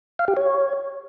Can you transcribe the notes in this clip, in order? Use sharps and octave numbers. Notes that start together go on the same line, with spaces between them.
F5
G4
C#5